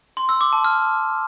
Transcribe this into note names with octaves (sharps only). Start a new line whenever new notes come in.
C6
E6
D6
A5
F6